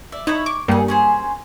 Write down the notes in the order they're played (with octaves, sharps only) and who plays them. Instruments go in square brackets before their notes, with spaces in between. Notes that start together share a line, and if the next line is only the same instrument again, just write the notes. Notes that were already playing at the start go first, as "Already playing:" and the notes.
[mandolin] D5 E5
[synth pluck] D#4 [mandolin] E4 C#5 B5
[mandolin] C#6 [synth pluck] D6
[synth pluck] G2 G3 A#3 [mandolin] G#4 A4
[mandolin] C#4 G#4 C5